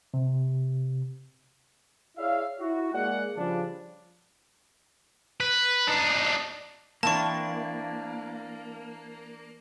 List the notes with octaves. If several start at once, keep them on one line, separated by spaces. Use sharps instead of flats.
C3
E4 G#4 C#5 D5 E5 F5
E4 F#4
G#3 A#3 G#4 D5 F#5
C#3 F3 G3 D4
B4
D4 D#4
E3 A#3 C4 D4 A5 C#6